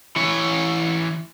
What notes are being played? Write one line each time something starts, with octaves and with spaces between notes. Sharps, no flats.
E3 C#5